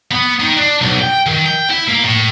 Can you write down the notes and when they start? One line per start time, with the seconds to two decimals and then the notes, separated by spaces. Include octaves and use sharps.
0.11 B3
0.40 D#3
0.57 D4
0.81 B1
1.00 G5
1.26 D#3
1.46 G5
1.70 E4
1.88 A#3
2.04 A2